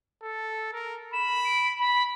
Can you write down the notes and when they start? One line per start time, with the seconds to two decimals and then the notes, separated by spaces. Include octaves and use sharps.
0.23 A4
0.73 A#4
1.13 B5 E7
1.45 D7
1.80 B5